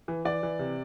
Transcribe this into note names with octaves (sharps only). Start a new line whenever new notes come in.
E3
E3 D5
E3
C3